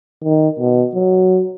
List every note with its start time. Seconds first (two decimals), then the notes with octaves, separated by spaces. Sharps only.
0.24 D#3
0.59 B2
0.95 F#3